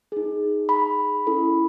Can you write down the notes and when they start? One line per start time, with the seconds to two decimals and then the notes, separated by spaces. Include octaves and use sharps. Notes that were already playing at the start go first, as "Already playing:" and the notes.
0.12 D#4 G#4
0.69 B5
1.27 C#4 E4 A4